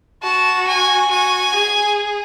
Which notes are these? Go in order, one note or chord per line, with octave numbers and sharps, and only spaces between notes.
F#4 A5
G#5
F#4 G#5
G#4